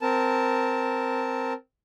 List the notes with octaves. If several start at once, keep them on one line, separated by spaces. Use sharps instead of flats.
C4 A#4 A5